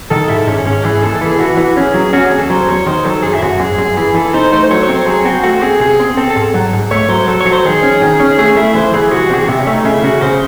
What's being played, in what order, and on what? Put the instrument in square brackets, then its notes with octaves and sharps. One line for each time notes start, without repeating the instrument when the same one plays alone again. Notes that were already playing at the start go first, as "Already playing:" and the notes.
[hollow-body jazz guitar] D#3 [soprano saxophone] A4
[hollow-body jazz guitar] G#2 [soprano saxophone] E4
[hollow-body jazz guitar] G#2 [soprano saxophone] C#4
[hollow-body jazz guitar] G#2 [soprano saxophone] C#4
[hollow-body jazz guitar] E3 [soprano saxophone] G#4
[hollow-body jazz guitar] D#2 [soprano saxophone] A4
[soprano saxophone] A4
[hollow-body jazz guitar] E3
[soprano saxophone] G#4
[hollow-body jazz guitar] E3 [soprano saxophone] F#4
[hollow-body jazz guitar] E3
[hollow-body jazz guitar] C#4 [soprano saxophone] G#4
[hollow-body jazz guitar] F#3
[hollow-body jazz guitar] C#4 [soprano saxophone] F#4
[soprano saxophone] G#4
[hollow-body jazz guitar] D#2
[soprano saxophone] A4
[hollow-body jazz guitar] F#3 [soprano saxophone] C5
[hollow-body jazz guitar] E2 [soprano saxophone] C#5
[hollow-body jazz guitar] D#3 [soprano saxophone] C5
[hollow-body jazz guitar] F#3 [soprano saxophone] A4
[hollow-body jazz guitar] F#2 [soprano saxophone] G#4
[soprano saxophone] E4
[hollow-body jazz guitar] F#2 [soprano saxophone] F#4
[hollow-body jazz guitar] F#2 [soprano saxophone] G#4
[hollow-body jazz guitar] F#2
[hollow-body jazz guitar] E3 [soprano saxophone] G#4
[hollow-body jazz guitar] E3 [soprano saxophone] A4
[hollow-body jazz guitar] D#4 [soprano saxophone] C5
[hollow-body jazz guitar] A3 [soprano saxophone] C5
[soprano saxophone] C5
[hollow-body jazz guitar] F#3 [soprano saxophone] C#5
[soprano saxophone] C#5
[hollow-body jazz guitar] C4
[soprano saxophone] C5
[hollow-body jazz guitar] F#3 [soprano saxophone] G#4
[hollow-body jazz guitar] C4 [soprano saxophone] F#4
[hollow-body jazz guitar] A3 [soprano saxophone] F#4
[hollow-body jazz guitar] C4 [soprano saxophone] G#4
[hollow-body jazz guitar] C3 [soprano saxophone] G#4
[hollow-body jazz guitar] C4
[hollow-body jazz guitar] C4 [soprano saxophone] A4
[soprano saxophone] A4
[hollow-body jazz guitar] G#2
F#3
G#2
[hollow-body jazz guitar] A3 [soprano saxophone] C#5
[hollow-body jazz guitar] F#3 [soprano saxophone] C5
[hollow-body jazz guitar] F#3 [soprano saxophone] A4
[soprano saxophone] C#5
[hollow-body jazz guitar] F#3
[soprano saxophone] C5
[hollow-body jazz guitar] D#3 [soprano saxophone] G#4
[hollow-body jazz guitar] C#4
D#3
C#4
[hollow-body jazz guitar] A3 [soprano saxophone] G#4
[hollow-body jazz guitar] A3 [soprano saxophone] E4
[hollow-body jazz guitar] E3 [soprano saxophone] C5
[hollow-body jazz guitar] E3 [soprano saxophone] G#4
[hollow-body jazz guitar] C2 [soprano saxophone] F#4
[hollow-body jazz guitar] C3 [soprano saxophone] G#4
[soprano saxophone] F#4
[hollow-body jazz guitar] C3 [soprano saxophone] E4
[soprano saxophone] C#4
[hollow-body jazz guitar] A3
[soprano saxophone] D#4
[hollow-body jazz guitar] C#3 [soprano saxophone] E4
[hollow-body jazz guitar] C#3 [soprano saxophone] F#4
[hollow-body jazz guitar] C#3 [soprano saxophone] C5